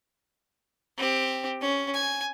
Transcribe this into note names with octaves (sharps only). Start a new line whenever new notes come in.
C4 G4
C#4
G#5